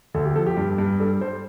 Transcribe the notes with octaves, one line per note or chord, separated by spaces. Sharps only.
D2 A4
G4
F3 A4
G4
G2
G2
G3 A4
G3 C5